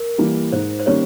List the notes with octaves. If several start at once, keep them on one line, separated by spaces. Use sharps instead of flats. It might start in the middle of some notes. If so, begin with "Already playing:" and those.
Already playing: A#4
E3 G3 A#3
G#2 C5
C5
D#3 G3 A#3 C#4 C#5